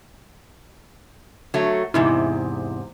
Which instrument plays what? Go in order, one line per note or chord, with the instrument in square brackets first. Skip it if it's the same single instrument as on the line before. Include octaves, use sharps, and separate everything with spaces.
[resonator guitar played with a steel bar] F#3 A3
[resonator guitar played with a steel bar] E2 G#2 C3 [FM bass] E4